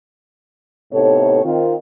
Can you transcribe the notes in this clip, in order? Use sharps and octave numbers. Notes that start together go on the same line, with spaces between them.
A2 C3 B3 D#4 A4 C#5
D#3 C4 F4